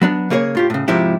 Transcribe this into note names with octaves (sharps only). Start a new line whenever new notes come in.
F#3 B3 D4
C#3 A#3 G#4 C5 C#5
A2 F4 G4
A2 C#3
G#2 C3 F3 G#3 E4 G4